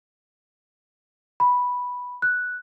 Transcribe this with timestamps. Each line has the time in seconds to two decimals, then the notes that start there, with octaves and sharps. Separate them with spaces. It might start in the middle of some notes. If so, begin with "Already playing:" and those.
1.40 B5
2.22 F#6